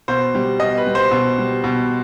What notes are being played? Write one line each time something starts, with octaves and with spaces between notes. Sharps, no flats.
B2 C5
G3
B2 D#5
B4
G3
C5
B2
G3
B2